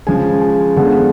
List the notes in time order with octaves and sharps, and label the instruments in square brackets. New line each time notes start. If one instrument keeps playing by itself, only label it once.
[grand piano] C#3 F3 G#3 G#5
G#5
D3 F3 G#3 B3 F#5